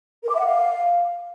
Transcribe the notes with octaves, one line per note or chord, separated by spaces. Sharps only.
A#4
D6
E5
F#5
F5